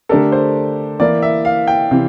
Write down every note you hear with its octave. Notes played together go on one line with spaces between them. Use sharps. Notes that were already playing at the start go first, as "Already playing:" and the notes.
D3 A3 D4 G4 A4 A#4
C5
E3 A#3 E4 D5
E5
F5
G5
C3 E3